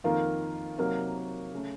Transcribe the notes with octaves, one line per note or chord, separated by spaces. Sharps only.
F2 D#3 A#3 F4 A#4
C3 F#3 A#3 D#4 A#4
C#3 A3